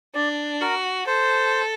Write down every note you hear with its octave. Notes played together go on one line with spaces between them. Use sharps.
D4 D5
F#4 A#4
A4 C5